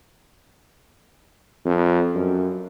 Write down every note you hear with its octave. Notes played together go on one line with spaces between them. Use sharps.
F2
F#2